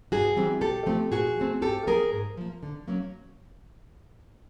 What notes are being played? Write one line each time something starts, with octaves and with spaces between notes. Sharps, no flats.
G2 F#4 G#4
E3 G3 C4
A#2 G4 A4
F3 A3 C4
A#2 F#4 G#4
F3 A3 C4
G#2 G4 A4
F3 A#3 G#4 A#4
G#2
F3 A#3
D3
F#3 A#3 C#4